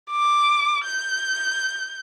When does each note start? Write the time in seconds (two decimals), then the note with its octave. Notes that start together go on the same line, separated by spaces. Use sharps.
0.11 D6
0.85 G6